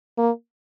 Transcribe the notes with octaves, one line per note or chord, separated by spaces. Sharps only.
A#3